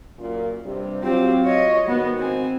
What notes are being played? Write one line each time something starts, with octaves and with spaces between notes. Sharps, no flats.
F#2 A#2
G2 C3 G3
F#3 C4 F4 G4
C#5 D#5
G#2 D#3 B3 F#4
C4 G#5